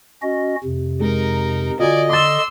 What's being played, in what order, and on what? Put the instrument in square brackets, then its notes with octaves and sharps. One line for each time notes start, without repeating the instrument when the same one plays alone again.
[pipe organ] C#4 F#4 D#5
F2 C3
[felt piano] G#3 [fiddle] D#4 A#4
[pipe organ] D3 [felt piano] F4 F#4 [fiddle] D5 G#5 [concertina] D#5
[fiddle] C6 E6 [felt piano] D6 A6